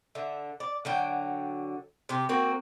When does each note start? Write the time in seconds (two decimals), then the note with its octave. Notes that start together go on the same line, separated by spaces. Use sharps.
0.15 D3 E5
0.60 D5
0.85 D3 F#3 G5
2.09 C3 G4
2.29 A#3 C4 F#4 A#4